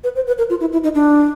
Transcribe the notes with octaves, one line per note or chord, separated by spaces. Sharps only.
B4
C5
B4
A#4
F4
E4
E4
D#4
D4